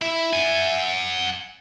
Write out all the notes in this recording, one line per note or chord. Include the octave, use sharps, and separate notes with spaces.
E4 E5
F#5 G#5